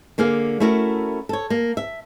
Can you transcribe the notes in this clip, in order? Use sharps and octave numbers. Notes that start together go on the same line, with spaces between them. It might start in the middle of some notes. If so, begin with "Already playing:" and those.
D3 A#3 G#4 F5
A3 C#4 E4 F#4 A#4
A4 C#5
A#3
E5